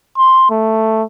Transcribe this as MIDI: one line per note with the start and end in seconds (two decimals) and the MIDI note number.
0.17 0.49 84
0.50 1.02 57